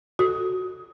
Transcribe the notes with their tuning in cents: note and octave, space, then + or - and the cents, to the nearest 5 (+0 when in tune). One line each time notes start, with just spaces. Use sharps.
F#4 +0 A4 +0 D#6 +20